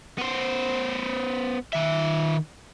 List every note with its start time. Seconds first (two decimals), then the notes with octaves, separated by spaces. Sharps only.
0.19 B3 C5
1.73 D#3 E5